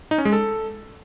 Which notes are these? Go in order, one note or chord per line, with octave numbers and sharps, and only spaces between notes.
D#4
C#4
G#3
A4